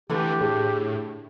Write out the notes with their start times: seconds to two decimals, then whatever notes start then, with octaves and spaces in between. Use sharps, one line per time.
0.10 D3 E3 A3 D4 G4
0.41 A2 G#4